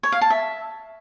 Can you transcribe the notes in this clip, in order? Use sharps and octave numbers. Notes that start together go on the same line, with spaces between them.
C#5
F5
A5
E5